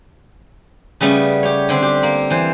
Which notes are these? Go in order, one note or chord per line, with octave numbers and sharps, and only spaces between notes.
C#3 G3 A3 B3
G4 C#5
D3 C4 D4
G4
A#3
E3 C5